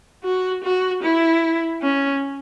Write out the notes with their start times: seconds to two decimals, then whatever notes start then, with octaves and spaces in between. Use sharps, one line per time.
0.24 F#4
0.64 F#4
1.03 E4
1.82 C#4